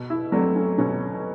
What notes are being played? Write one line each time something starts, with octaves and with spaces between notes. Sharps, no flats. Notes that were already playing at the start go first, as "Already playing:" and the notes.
Already playing: B2
E4
F#3 A3 C4 D4
C#4
B2 C#4